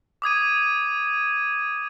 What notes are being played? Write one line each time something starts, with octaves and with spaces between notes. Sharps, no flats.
D6 D#6 G#6 D#7